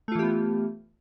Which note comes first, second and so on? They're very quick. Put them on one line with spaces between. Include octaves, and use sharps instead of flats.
A3 F4 E3 G4 B3